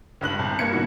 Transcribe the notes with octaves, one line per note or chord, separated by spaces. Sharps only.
C#2 G2 F#6 F#7
G1 C2
G2 A#3 G#6 C#7
B2 D#3 E4 F#4